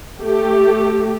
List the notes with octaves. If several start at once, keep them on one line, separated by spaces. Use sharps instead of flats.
A3 G4